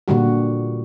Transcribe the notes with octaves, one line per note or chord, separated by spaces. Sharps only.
A#2 D3 G3 F#4